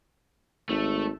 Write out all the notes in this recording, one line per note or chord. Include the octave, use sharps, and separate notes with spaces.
G#1 A3